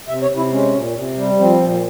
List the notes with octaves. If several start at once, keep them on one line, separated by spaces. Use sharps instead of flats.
C3 E5
C#5
C3
E4
G#3 C#4
A#2
C3
G3
F3 C4
A#2